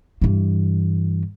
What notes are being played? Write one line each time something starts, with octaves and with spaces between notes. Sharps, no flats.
G2 E3